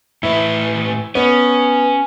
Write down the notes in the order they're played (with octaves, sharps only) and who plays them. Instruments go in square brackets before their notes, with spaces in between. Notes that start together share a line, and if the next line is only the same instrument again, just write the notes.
[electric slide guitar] A2 B4 [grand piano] E4
[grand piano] B3 [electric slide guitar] C#4